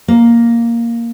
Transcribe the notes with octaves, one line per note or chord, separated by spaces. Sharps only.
A#3